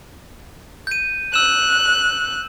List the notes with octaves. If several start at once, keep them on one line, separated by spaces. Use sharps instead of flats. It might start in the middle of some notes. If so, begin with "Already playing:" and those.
G6 D#7
E6 F#6 E7